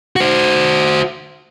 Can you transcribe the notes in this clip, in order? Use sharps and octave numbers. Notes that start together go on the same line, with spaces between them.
F#4 C5